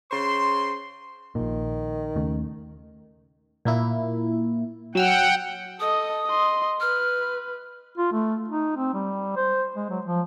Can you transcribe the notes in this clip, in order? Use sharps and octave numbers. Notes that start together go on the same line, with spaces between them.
C#3 C5 C6
A#1 A#2 D#3
D#2 C#3 A3
A#2 A#3 E4
F#3 F#5 G5 E6 F6
A4 D#5 D#6
D#5 C6
B4 F6
F4
A3
D#4
C4
G3
C5
G#3
F#3
F3